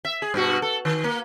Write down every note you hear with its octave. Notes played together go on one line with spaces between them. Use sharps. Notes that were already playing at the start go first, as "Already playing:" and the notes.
E5
G#4
G2 B2 F#4
A4
D#3
A#3